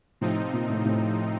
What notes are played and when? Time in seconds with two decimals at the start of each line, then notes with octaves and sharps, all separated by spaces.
0.21 A2 C3 F3 C4 D#4
0.53 A#2
0.70 A2
0.85 A2